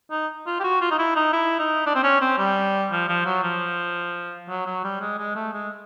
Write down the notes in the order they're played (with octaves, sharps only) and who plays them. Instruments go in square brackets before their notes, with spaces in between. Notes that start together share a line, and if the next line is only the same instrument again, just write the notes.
[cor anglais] D#4
F4
G4
F#4
F4
D#4
E4
D#4
E4
D#4
D4
C4
C#4
C4
G3
F3
F3
F#3
F3
F#3
F#3
G3
G#3
G#3
A3
G#3